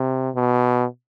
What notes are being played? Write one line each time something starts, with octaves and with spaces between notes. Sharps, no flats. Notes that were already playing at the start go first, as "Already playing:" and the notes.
Already playing: C3
B2